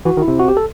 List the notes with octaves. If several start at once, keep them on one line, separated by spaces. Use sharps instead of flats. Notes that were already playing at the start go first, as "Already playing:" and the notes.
E3 F#4
D#3
E4
C3
F#4
G4
A4